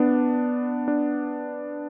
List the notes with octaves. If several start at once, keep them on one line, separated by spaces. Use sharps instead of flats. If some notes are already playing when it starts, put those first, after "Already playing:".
Already playing: B3 D4
D4